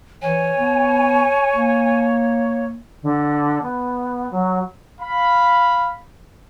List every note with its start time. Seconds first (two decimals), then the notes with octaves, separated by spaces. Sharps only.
0.22 E3 C#5 G#5
0.58 B3
1.53 A#3
3.02 D3
3.62 B3
4.30 F#3
4.99 F5 B5